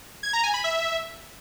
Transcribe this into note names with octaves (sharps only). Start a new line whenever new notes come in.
G#6
A#5
G#5
B5
E5